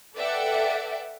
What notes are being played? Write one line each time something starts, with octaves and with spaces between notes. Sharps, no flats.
A4 B4 D5 E5 F#5 G5